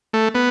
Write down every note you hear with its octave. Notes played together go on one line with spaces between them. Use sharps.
A3
B3